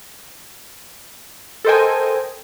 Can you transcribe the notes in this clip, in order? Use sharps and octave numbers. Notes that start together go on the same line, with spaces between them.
A4 A#4 C5 D#5 G5 G#5